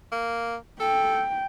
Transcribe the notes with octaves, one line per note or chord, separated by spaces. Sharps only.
A#3
A4 G5